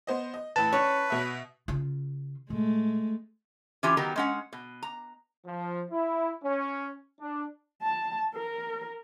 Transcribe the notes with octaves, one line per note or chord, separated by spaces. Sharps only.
B3 C5 D#5
D#5
A1 B4 A5
C#4 B4 C#5
B2 E5
C#3 F4
A#2 G#3 A3
E3 C#4 F4 G4 G#5
D#3 F#3 G3 B3 G4 A#4
G#3 C#4 F#5
B2
A#5
F3
E4
C#4
D4
A5
A#4